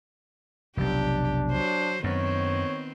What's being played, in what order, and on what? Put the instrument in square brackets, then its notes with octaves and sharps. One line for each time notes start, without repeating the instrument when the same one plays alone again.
[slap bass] F1 B1 [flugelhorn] D4 [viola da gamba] G4
[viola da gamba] F#3 C5
[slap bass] F#2 [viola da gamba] D#3 B3 C4 [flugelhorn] C#5